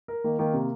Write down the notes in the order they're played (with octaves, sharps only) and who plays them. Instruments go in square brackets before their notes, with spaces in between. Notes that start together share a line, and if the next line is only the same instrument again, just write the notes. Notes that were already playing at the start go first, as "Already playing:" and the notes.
[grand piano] A#4
[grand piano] D#3 [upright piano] A#3
[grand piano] D#3 [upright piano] A#3
[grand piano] C3